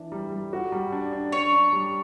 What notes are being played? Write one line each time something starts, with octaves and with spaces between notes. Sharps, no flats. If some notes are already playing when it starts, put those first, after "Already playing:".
Already playing: E3 D4
G3
G3
F#4
G3
D4
D4
D4 C#5
D4
G3